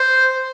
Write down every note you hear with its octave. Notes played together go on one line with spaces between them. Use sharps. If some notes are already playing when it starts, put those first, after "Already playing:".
Already playing: C5